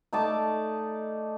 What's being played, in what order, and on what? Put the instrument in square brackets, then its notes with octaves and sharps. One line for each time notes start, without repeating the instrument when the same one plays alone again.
[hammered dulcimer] A3 D#4 D5 A5